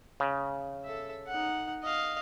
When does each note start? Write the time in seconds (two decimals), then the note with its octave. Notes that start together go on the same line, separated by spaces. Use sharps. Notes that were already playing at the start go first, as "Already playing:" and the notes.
0.20 C#3
0.85 A4 E5
1.27 D#4 F#5
1.83 D#5 F5